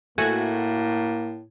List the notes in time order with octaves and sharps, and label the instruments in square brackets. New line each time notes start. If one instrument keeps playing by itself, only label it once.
[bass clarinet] A2 [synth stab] A3 F#4 [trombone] A#3 [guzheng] G#5